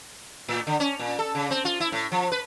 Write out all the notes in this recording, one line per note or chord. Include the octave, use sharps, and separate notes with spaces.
A2
D3
C#4
A#2
A4
C#3
C4
F4
E4
A2
F3
B4